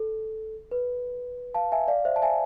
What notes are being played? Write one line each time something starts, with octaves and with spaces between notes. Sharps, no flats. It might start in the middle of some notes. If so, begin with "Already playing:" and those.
Already playing: A4
B4
F5 A5
E5 G#5
D5 F5
C5 E5
A5
E5 G#5